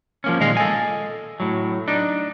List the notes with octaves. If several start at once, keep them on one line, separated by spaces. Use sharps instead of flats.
F3 A#3 C#4
A#2 D#3 G#3 D#5 F5
A4 D#5 G#5
A2 F#3
D4 D#4